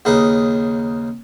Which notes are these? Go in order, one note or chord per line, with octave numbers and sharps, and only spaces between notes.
D#2 C#3 D#4 B4